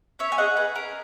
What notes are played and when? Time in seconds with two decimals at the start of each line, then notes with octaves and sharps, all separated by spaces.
0.19 C#4 C#5 E5
0.32 G#5
0.38 G#4 D#5 F#5
0.56 G#4 B4
0.75 C#4 A#4